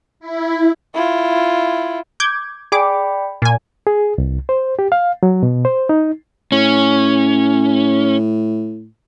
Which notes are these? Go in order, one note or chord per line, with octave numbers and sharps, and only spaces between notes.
E4
E4 F4
D6 G6 G#6
G#4 D5 G5 B5 D6
A#2 G#5
G#4
C2
C5
G4
F5
F#3
B2
C5
D#4
A2 C#4